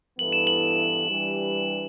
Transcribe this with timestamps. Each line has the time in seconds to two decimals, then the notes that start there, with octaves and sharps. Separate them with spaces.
0.19 G2 E3 B3 E4 A4 F#7
0.32 E7
0.47 F#7
1.10 E3 G3 D4 G4 B4